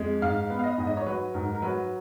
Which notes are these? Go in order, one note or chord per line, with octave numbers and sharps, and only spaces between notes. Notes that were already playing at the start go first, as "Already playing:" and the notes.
Already playing: F2 G#3
G#2 F5
B3
F5
D#5
G#2
D#5
C#5
F#3 B4
G#2 A#4
A#4
F#3 B4